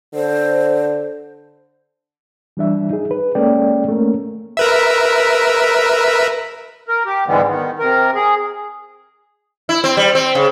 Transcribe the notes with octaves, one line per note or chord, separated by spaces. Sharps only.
D3 C5
E3 G3 D4 E5
D#4 G#4
B4
G#3 A#3 C#4 A4 D5 G5
A3 A#3 C#4 A#4
A#4 B4 E5
A#4
G4
G#2 D3 E3 G3 G#3 B3
D#3 B3
C3 A#4
G#4
E4
C4
G3
C4
C#3